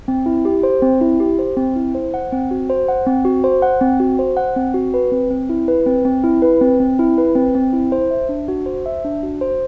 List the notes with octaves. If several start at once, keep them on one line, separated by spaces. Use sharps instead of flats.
C4
E4
G4
C5
C4
E4
G4
C5
C4
E4
C5
F#5
C4
F#4
C5
F#5
C4
F#4
C5
F#5
C4
F#4
C5
F#5
C4
F#4
B4
C4
C4
E4
B4
C4
C4
E4
B4
C4
C4
E4
B4
C4
C4
E4
C5
E5
D4
F#4
C5
E5
D4
F#4
C5